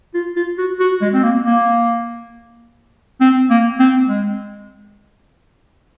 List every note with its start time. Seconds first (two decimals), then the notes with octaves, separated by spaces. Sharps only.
0.14 F4
0.36 F4
0.58 F#4
0.80 F#4
1.02 G#3
1.14 C4
1.23 A#3
1.45 A#3
3.21 C4
3.50 A#3
3.79 C4
4.08 G#3